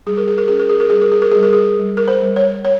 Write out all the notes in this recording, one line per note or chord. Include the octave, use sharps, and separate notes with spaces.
G3 G#4
A#4
G#4
A#4
C#4 G#4
A#4
G#4
A#4
G3 G#4
A#4
G#4
A#4
G3 G#4
A#4
G#4
G3
A#4
C5
G3
C#5
C#5